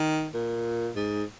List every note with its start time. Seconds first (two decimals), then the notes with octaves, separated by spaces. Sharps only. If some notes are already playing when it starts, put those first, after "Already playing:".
Already playing: D#3
0.34 A#2
0.96 G#2